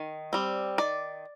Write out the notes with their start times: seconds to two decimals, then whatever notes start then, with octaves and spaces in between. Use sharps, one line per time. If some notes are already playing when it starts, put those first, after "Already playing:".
Already playing: D#3
0.33 G3 C4
0.78 D#3 D5